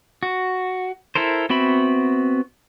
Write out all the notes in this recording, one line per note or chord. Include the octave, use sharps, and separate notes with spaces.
F#4
E4 A4 A#4 C5
B3 C4 F#4 E5 B5